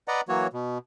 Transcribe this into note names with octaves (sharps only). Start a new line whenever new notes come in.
B4 D5 D#5 F#5 A#5
E3 F#3 A#3 F#4 C#5
B2